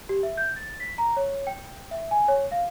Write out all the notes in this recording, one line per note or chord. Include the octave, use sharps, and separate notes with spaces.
G4
E5
G6
A6
B6
A#5
C#5
G5
E5
G#5
C#5
F5